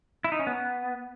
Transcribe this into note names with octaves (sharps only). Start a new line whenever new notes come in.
E4
D#4
C#4
B3